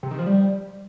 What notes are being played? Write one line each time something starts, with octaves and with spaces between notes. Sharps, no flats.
C3
D#3
F3
G3